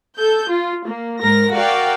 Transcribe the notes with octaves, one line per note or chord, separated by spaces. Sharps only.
A4 G6
F4
A#3
G#2 A#4 A#6
F#4 A#4 D5 F5 G5